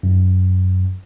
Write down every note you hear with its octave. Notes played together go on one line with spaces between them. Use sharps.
F#2